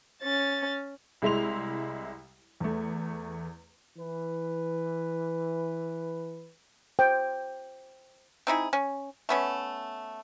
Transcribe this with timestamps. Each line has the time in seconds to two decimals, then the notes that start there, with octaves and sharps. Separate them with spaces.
0.23 C#4 A6
1.22 C2 G#3 E4 C6 F7
2.60 E2 A3
3.97 E3 B4
6.99 C5 G5
8.47 C4 D#4 E4 G#4
8.73 C#4
9.29 A3 B3 C#4